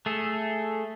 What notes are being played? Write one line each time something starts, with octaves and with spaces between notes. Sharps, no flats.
A3 G#4 A4